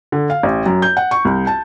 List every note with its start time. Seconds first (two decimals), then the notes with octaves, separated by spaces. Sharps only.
0.12 D3
0.30 F5
0.43 A1
0.66 F#2
0.82 G6
0.97 F#5
1.11 C#6
1.25 C2
1.47 A5